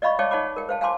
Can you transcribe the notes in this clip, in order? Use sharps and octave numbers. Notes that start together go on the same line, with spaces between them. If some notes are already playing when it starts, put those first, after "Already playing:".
D5 D#5 F5 B5 C#6
C#5 D5 F5 G5 A5 D6
D#4 C#5 F#5 A5 B5 D6
A#4 G5
C5 F5 A5
F5 G#5 A5 C6 D6